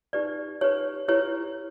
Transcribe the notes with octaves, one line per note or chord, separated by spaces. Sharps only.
D#4 G4 B4 D5
D#4 G4 B4 C#5
E4 G4 B4 C#5